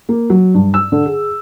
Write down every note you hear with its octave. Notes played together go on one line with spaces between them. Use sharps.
A#3
F#3
G2
E6
D3
G#4